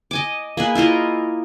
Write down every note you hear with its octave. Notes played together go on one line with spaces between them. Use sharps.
D#5 G#5 D6
A#3 G#4 B4
E4 F4 A#4 D#5